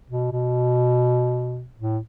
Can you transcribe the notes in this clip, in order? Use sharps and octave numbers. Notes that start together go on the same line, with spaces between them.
B2
B2
A2